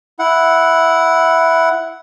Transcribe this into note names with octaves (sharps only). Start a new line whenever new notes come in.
E4 F#5